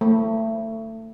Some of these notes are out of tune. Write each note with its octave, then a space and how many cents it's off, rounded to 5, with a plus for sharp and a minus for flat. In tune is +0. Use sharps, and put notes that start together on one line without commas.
A3 +25